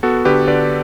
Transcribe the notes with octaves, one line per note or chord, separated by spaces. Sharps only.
B3 F#4 A4
D3 G4 B4
D3 B4 D5